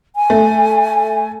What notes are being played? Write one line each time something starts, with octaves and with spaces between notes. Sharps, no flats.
G#5
A3